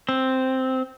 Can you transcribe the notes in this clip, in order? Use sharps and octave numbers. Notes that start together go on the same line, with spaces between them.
C4